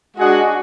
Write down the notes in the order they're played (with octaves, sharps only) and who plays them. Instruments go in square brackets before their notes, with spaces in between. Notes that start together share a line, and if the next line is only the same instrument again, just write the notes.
[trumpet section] G#3 D4 G#4 D#5 F#5 [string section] F#4